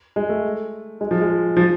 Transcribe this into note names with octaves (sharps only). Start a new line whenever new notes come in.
G#3
A3
G#3
F3
G#3
F3